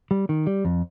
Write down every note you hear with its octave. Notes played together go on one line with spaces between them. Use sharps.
G3
D#3
G3
F2